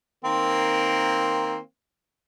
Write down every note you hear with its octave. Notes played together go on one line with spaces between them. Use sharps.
D#3 A#3 C4